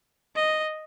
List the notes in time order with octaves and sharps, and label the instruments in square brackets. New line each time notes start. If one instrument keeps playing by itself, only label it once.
[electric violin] D#5